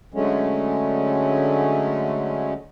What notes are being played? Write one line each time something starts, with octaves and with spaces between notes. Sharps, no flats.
D3 F#3 G#3 A3 C#4